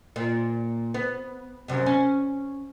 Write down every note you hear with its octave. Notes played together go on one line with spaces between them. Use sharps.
A#2
B3
F#2 C3
C#4